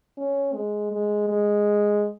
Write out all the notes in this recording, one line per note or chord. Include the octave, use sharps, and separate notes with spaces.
C#4
G#3
G#3
G#3